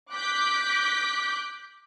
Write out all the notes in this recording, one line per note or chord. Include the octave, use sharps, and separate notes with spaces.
D6 F#6 G6 B6